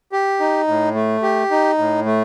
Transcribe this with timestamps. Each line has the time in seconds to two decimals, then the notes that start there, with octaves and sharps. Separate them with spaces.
0.12 G4
0.40 D#4
0.68 A2
0.95 A3
1.23 G4
1.51 D#4
1.78 A2
2.05 A3